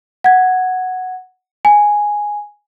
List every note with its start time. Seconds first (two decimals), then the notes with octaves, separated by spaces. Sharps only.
0.24 F#5 G#6
1.65 G#5